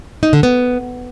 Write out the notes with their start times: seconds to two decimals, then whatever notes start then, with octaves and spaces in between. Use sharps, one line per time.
0.23 D#4
0.33 D3
0.43 B3